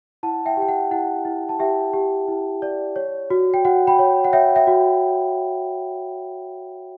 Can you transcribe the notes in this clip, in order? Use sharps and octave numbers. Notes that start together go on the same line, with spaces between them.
E4 F#5 A5
E5 G5
G4
G5
F#5
E4 F#5
E4
A5
G4 E5 G5
G4
E4
D5
C#5
F#4
G5
F#4 F#5
G5 B5
C#5
F#5
C#5 E5 G5
E5 G5
F#4